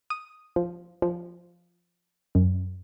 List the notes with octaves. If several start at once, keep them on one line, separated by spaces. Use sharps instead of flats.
D#6
F3
F3
F#2